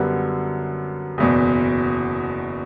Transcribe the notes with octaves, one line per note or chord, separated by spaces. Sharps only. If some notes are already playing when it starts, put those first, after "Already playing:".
Already playing: F#2 D3 G3 B3
F#1 E2 B2